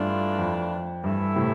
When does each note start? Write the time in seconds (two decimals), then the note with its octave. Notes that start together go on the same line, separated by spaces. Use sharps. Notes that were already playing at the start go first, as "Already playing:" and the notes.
Already playing: G2 E3 A3 D4 F4
0.38 F2
1.03 G2 E3 A3 E4 A4
1.35 A2 C3